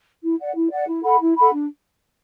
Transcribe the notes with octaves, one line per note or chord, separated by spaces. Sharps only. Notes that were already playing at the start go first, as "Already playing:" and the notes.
E4
D5 F#5
E4
D5 F#5
E4
A4 F#5 B5
E4
A4 F#5 B5
D4